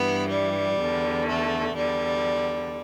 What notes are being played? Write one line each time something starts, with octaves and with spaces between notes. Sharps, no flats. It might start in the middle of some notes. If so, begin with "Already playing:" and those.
Already playing: G2 E3 B3
G3
E2 D3
A3
E2 D3 G3